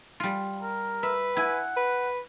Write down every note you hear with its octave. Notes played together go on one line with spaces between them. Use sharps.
G3 F4
A#4
B4 E5
E4 F#5 G#5
B4